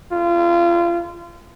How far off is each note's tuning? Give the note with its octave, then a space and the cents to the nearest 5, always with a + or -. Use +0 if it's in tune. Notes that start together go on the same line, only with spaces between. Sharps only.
F4 -30